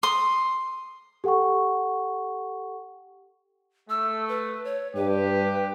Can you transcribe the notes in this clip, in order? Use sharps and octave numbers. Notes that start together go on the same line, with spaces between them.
C6 D#6
G4 A4 F#5 G5 C#6
A3 E6
B4
C#5
G2 G4 B4